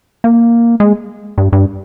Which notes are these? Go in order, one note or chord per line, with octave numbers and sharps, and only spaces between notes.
A#3
G#3
G2
G2